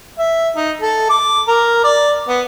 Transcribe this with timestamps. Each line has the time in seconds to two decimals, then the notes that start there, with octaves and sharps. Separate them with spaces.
0.19 E5
0.56 D#4
0.81 A4
1.10 D6
1.48 A#4
1.84 D5
2.28 B3